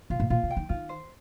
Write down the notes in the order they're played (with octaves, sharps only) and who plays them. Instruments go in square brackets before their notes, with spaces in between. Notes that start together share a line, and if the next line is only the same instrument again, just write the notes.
[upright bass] C3 [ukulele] F4
[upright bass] A2
[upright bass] A#2 [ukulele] F4
[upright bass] C3
[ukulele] G5
[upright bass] D#3
[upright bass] D#3 [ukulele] F4
[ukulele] C5